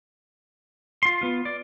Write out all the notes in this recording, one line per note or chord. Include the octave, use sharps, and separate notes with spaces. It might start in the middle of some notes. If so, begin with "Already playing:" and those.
F4 C6
B3 F4
D5